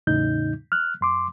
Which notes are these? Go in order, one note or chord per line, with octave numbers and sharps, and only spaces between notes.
E2 A2 C#3 D#4 G6
F6 F#6
F#2 C6 D6